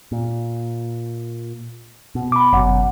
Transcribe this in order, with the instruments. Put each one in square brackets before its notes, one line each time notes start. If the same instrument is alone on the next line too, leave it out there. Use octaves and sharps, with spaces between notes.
[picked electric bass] A#2
B2
[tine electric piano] B5 D6
[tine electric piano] G1 F#5 [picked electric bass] F#2 B2